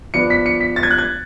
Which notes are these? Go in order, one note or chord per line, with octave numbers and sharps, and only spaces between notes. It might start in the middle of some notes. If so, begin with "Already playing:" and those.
F3 B3 D4 C#7
B6
C#7
B6
A6
G#6
F#6
G#6